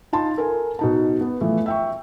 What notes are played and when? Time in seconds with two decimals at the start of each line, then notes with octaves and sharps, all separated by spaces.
0.13 D#4 F4 A5 C6
0.38 A4 A#4 G#5
0.79 B2 D#4 A5
1.21 B3
1.41 E3 F3 A3
1.66 E5 G5 C#6